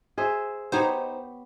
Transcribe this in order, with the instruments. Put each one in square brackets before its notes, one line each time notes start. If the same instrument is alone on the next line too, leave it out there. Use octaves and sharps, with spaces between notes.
[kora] G#4 C5 E5
[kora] B3 G4 C#5 [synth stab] D#4 C5